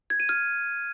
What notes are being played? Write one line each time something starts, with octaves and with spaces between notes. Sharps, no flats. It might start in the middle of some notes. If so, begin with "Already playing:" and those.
G#6
D#7
F6